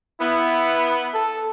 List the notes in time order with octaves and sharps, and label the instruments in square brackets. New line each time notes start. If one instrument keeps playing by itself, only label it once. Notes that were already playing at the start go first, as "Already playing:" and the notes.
[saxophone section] B3 [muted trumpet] E4
[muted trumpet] A4